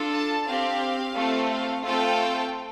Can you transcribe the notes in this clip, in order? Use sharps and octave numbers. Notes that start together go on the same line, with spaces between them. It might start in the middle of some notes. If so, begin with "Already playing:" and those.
Already playing: D4 F4 A4
A5
C4 G4 F5
A3 C4 F4 A4
F5
A3 C4 F4 A4 G5